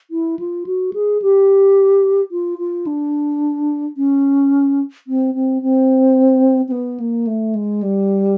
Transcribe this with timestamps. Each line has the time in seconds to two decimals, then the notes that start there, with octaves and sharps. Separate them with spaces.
0.11 E4
0.39 F4
0.66 F#4
0.93 G#4
1.22 G4
2.32 F4
2.59 F4
2.87 D4
3.97 C#4
5.07 C4
5.34 C4
5.62 C4
6.68 C4
6.72 B3
7.00 A#3
7.27 A3
7.55 G#3
7.82 G3